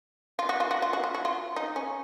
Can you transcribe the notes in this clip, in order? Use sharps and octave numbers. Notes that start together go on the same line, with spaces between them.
F4
F#4
F4
F#4
F4
F#4
F4
F#4
F4
D#4
C#4